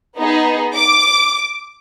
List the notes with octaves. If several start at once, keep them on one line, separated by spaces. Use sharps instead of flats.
B3 D#4 G#4
D6